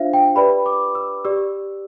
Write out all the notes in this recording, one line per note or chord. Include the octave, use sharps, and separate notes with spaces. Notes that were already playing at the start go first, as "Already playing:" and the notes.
Already playing: D4 F4 C5 E5 F5
G5
G4 B4 D5 B5
D6
E6
G4 D5 E6